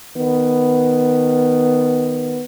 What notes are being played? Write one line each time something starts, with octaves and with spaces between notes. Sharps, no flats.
D#3 B3